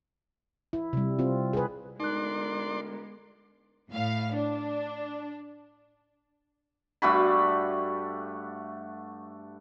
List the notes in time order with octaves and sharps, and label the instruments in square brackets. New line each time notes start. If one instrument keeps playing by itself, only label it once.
[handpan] E4
C3 G3
C4 F4
G#4 B4
[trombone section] D2 A#4 [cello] G#3 B3 [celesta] D#4 F#6 [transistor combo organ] D5 C6
[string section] A2 F5
D4
[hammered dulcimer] G2 A3 F#4 B5